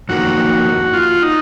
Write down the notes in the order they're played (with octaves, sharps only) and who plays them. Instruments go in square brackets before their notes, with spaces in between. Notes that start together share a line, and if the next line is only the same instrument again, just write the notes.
[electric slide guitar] F2 D#3 A#3 [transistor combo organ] F#4
[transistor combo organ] F4
D#4